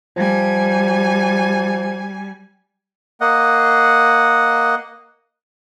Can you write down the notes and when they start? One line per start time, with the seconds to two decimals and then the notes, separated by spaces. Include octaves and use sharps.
0.17 F3 G3 G#5
3.21 A#3 D#5 F#5